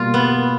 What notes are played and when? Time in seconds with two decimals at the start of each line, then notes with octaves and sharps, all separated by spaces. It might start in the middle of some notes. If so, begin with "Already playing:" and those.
Already playing: B2 G3 A#3 F4
0.14 B3